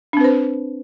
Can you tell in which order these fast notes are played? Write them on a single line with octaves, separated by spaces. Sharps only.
D4 C4 B4 C5